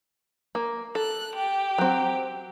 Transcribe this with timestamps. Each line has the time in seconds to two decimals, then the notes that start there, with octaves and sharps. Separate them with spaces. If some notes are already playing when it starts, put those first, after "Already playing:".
0.55 A#3
0.95 A4 F#6
1.35 G4
1.78 F#3 C4